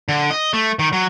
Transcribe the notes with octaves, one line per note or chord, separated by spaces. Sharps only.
D3
D#5
A3
D#3
F#3